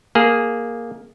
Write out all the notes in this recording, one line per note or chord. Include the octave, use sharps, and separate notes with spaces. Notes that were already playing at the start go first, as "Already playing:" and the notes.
A#3 G#4